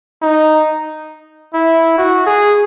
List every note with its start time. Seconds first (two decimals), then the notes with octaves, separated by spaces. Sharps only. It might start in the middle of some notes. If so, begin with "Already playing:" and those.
0.22 D#4
1.54 E4
1.98 F#4
2.26 G#4